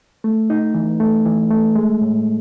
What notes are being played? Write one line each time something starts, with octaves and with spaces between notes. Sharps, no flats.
A3
D#4
E3
A3
E3
A3
G#3
A2